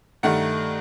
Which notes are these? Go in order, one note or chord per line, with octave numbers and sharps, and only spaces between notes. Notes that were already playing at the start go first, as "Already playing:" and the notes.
G2 D#3 A3 D#4 F#5